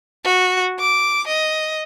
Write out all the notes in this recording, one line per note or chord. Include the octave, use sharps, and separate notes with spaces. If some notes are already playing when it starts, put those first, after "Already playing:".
F#4
D6
D#5